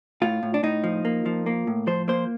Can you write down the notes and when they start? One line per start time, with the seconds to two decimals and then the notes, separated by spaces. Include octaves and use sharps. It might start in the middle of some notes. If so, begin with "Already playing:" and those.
0.22 A2 F4
0.43 A2
0.54 D4
0.63 A2 D#4
0.84 F3
1.05 A#3
1.26 F3
1.46 A#3
1.67 A2
1.87 F3 C5
2.08 A#3 C5